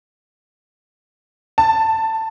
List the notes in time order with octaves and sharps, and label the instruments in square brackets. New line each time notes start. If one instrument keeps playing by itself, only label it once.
[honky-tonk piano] A5